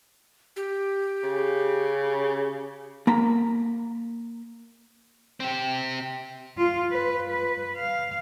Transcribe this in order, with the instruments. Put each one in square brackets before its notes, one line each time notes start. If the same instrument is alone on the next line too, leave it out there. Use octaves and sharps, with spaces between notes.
[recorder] G4
[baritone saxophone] C#3
[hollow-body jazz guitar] A#3 A#5 B5
[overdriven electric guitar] C4 G4
[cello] F4
B4
B4
F5